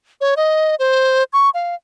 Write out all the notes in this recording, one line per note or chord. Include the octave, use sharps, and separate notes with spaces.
C#5
D#5
C5
C#6
F5